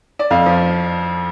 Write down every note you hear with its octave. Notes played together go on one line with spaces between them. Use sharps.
D5
F2 F5
F3